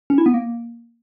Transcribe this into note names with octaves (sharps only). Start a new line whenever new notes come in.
C#4
E4
B3
A#3